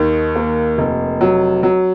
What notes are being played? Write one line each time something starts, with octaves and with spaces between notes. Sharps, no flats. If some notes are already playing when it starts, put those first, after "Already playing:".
Already playing: D#2 D#3
A#3
F1
F#3
F#3